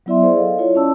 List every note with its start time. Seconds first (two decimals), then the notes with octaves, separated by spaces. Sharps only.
0.06 F#3 B3 E4 D5 E5 C6
0.22 G#4 C5 D5
0.37 A4 D#5 F5
0.59 E4 F4 C#5
0.75 C#4 D5 A5 E6